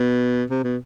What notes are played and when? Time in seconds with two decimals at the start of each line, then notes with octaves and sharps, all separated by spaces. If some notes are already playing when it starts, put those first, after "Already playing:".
Already playing: B2
0.50 C3
0.64 B2